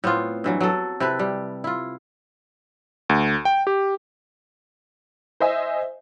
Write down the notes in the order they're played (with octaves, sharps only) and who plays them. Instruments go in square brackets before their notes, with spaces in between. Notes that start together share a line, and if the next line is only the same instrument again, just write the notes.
[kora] A2 B3 C4 F4
G2 E3 F#3
F#3 A4
C3 E4 A4 B4
G3
E4 F4
[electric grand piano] D2
G5
G4
[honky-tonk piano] C5 D#5 E5 G#5